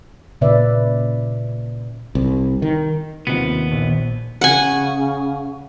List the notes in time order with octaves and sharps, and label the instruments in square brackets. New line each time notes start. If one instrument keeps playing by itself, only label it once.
[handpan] A#2 C#3 B4 D5 E5
[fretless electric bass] C2
D#3
[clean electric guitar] D#2 B3 [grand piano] C3 F4 F#5
[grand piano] A#1
[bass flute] C#3 [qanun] F#5 G#5